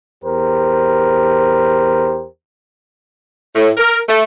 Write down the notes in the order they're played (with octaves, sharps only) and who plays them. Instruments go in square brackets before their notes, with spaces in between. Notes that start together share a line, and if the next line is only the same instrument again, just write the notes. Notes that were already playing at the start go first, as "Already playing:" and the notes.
[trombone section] E2 G4 A#4 C5
[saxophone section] A2
A#4
A3